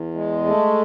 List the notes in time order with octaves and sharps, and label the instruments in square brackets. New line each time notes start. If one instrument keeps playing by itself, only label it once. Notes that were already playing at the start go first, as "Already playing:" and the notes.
Already playing: [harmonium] E2
G#3
A3